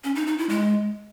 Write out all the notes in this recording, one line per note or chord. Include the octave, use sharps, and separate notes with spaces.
C#4
D#4
D#4
E4
G#3